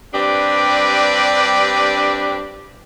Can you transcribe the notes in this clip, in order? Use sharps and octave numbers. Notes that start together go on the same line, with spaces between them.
G2 C4 D4 G4 B4 D5